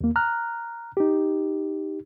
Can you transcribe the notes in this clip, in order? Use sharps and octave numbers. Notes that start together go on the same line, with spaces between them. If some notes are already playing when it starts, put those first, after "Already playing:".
D#2 A#3
A#5 F6 F#6
D#4 G4